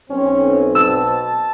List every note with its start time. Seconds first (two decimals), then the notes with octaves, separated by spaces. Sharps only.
0.11 B1 C4 C#4
0.75 B2 A5 E6